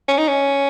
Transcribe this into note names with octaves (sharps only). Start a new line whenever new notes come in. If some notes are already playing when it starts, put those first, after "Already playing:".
C#4
D#4
C#4